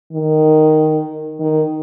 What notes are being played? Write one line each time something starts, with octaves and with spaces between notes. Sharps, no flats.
D#3
D#3